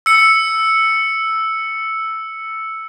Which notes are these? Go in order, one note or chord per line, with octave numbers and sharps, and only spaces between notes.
E6 C#7